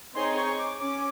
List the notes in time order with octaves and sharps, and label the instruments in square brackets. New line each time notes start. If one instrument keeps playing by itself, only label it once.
[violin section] C4 D#4 G#4 C#5 [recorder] C6
[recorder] C#6
D6
[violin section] C#4 [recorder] D6